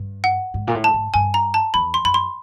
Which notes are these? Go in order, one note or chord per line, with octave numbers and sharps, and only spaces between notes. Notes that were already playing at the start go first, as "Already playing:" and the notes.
Already playing: G2
F#5
G#2
A#2
A2
A5
G#2
G2 G#5
A#5
A5
E2 B5
C6
F#2 B5
C6